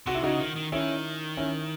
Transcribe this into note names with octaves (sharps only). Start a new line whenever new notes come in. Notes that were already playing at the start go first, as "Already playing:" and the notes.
C3 F#4
E4
C#3 D#4 F#4
D#3
D#3
D#3 C#4 E4
C#4 E4